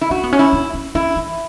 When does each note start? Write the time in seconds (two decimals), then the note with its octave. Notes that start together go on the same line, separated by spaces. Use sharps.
0.01 E4
0.11 D#4 F#4
0.24 B3
0.33 C#4
0.39 E4
0.53 D#4
0.74 C#4
0.95 C#4 E4
1.16 E3